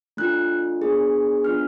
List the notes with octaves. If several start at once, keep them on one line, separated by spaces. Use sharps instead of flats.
A3 D4 F4 F#6
B3 D4 G#4
B3 D4 F4 F6